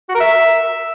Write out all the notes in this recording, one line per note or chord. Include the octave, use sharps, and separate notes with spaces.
F#4
A#4
E5